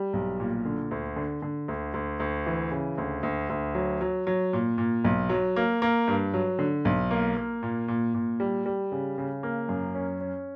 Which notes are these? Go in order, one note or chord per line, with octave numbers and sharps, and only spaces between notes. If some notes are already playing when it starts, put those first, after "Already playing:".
Already playing: G3
B1
A#2
D3
D2
D3
D3
D2
D2
D2
E3
C#3
D2
D2
D2
F#3
F#3
F#3
A#2
A#2
B1
F#3
A#3
A#3
G2
F#3
D3
B1
A#3
A#3
A#2
A#2
A#2
G3
G3
C#3
C#3
A#3
F#2
C#4
C#4